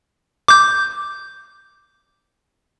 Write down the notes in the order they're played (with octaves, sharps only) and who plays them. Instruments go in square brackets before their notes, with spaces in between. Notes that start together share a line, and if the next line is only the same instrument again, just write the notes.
[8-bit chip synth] D6 G6